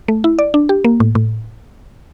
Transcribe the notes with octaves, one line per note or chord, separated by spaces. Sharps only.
A3
E4
D5
D4
G4
A#3
A2
A2